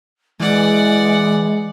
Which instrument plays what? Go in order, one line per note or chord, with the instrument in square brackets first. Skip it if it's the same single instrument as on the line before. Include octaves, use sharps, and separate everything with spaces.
[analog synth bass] E3 [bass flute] G#3 [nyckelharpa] D5 F#5